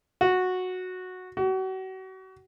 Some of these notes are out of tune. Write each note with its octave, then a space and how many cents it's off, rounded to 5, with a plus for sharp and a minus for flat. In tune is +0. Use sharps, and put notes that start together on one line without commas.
F#4 -10
F#4 +35